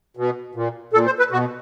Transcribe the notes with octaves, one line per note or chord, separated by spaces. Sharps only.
B2
A#2
A#2 A4
C5
B4
B2 F#4